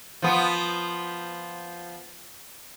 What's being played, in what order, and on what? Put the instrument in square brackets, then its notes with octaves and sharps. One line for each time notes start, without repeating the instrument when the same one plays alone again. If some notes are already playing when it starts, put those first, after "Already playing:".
[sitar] F3 B3